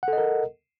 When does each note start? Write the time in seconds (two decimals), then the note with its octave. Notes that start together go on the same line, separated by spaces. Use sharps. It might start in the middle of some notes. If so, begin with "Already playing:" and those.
0.03 F#5
0.08 A4
0.13 D#5
0.18 A#4